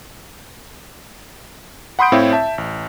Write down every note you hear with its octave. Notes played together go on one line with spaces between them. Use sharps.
F#5 B5 C6 D#6 G6 D7
A2 C4 E4 C#5 F5
E5 A5
A1